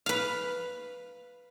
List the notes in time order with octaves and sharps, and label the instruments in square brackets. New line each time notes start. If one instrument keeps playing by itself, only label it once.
[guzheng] B4 F5